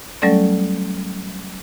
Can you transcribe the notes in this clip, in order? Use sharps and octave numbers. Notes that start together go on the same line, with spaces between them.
F#3 G3 A3 C#4 A4 D5